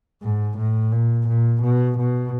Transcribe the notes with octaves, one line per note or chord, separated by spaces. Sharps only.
G#2
A2
A#2
A#2
B2
B2